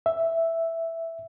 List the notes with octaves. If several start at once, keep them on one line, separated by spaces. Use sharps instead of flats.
E5